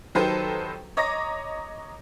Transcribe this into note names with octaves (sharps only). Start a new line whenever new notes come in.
D#3 F#3 G4 A4 B4 C5
C#5 D#5 A#5 D6 A#6